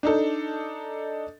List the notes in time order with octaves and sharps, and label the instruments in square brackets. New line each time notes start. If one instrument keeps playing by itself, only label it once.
[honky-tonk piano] D4 D#4 A4